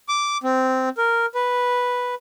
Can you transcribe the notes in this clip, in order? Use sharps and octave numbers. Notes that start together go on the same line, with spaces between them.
D6
C4
A#4
B4